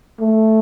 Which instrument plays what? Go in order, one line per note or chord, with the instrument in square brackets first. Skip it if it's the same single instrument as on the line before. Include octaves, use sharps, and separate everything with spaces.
[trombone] A3